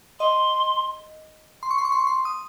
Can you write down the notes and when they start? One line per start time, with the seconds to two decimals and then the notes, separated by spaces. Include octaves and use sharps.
0.20 D#5 C6
1.63 C6
1.71 C#6
1.78 C6
1.85 C#6
1.92 C6
1.99 C#6
2.07 C6
2.25 D#6